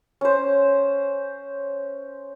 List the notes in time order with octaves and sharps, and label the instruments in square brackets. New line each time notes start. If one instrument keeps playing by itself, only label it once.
[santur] C#4 C5